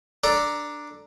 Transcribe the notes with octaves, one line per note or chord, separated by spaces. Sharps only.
D4 A4 D5 A#5